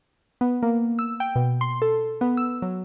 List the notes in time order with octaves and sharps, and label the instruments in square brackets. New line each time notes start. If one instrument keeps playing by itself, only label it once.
[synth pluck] B3
A#3
E6
G5
B2
C6
A4
B3
E6
F#3